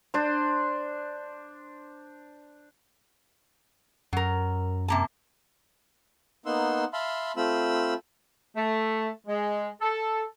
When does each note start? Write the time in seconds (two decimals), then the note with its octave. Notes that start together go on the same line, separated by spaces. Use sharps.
0.14 D4 C5
4.13 F#2 F#3 A#4
4.88 C3 A#3 A5
6.46 A#3 B3 D#4 F#5 C6 E6
6.93 E5 F5 A5 B5 C6
7.37 A3 C4 F4 B5 E6
8.56 A3
9.27 G#3
9.82 A4